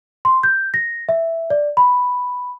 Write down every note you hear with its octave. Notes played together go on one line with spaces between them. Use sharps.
C6
G6
A#6
E5
D5
B5